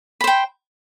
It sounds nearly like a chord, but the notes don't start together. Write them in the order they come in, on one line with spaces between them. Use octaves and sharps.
B5 C5 G5